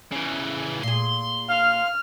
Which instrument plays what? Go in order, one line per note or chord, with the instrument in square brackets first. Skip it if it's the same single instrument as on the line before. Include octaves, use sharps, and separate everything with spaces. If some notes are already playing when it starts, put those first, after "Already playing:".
[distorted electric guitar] C#3 E3
[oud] A#2 G#4 [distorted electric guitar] C6
[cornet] F5 [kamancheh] F6